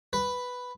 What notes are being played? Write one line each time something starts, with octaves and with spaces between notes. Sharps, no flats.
B4